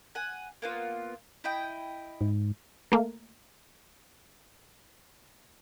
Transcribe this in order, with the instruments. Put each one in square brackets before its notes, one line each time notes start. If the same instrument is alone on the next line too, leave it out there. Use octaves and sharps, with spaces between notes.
[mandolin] F#5 G#5
A#3 B3 F4
E4 D#5 G5
[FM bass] G#2
[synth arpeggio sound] A3 A#3